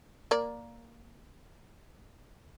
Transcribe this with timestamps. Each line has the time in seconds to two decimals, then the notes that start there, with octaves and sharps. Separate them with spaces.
0.31 A#3 D5